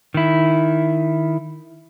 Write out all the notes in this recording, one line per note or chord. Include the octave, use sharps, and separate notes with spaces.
D#3 E4